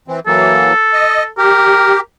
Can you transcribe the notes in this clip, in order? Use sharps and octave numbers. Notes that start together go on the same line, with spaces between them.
E3 C4
E3 F#3 A#3 A4
D#5
G4 A#4